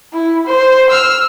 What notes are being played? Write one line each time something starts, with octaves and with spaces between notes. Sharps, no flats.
E4
C5
E6 F6